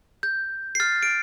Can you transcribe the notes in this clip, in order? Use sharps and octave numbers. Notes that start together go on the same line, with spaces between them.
G6
C7
F6 A6
D7